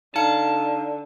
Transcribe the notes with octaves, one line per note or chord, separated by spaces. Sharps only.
D3 D#4 F5 A5 C#7